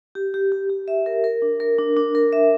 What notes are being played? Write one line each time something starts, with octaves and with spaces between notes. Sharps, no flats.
G4
G4
G4
G4
E5
A#4
A#4
D4
A#4
D4
D4
A#4
E5